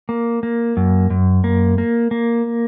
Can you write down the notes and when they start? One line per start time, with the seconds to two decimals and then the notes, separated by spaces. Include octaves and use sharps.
0.09 A#3
0.43 A#3
0.77 F#2
1.10 F#2
1.44 A#3
1.78 A#3
2.11 A#3